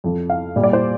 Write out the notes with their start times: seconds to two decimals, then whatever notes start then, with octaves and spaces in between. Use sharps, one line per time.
0.04 F2 F3
0.30 F5
0.56 A#2 G3
0.63 D5
0.73 C5